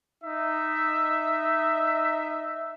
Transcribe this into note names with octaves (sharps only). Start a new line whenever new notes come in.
D#4 E5